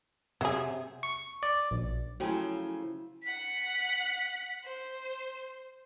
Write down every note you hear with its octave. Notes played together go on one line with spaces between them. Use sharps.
C3 F#3 G#4
C#6
D5
A#1
C#3 F3 F#3 A3 E4 G5 G#5
F#5 B6
C5